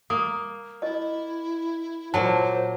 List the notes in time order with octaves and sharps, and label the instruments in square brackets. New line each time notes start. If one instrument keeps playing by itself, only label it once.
[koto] A#3 [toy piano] D#6
[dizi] E4 [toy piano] D#5
[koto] A#2 F#3 [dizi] C5 [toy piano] A5